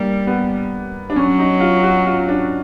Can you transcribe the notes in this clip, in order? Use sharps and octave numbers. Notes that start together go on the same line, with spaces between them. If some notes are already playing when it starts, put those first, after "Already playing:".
Already playing: G3 A#3 D4
B3
D4
F#3 C#4
D#4
F4
F#4
F4
D4